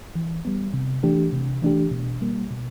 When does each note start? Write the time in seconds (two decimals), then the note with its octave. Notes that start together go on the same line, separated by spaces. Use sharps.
0.15 E3
0.45 G3 B3
0.74 C3
1.03 E3 A3 D4 G4
1.33 C3
1.62 E3 A3 D4 G4
1.91 B2
2.21 G3 A#3
2.51 B2